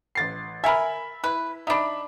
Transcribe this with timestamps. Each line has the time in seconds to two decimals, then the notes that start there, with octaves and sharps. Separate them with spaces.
0.15 A1 A6 C7
0.64 A#4 E5 G#5 B5
1.24 E4 B4
1.67 D4 D#4 E5 B5